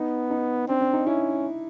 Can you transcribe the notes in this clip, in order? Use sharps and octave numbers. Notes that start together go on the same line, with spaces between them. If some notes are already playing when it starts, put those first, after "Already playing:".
Already playing: B3 D#4
D#4
C4 D4
D4
D#4
C#4 E4